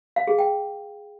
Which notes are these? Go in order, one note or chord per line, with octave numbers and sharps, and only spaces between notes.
F5
G#4
G5